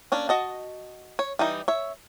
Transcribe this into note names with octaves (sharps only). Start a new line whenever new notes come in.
A#3 C#4 D4
F#4 D#5 A5
C#5
E3 G3 D#4
C#5 E5